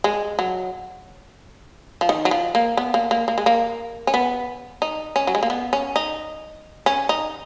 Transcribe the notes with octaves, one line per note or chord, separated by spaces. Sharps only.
G#3
F#3
F3
D#3
F#3
F3
A#3
B3
A#3
A#3
A#3
G#3
A#3
C#4
B3
D#4
C#4
F#3
G#3
A#3
B3
C#4
D#4
C#4
D#4